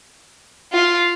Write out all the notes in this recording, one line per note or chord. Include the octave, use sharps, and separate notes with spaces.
F4